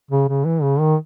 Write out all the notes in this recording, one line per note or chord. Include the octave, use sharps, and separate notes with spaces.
C#3
C#3
E3
C#3
D#3